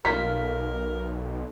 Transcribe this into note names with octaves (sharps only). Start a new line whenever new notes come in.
B1 G3 A#3 F4 A#4 B6